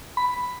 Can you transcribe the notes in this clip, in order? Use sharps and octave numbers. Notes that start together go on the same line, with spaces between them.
B5